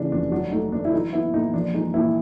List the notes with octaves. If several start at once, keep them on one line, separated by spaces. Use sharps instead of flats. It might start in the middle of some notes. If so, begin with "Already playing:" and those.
Already playing: C#3 E3 D4
F1 D4
F#3 D4
A3 D#4
D2 D4
E4
F#3 D#4
B3 E4
A#1 D#4
F3 D4
G#3 D#4
A#1 E4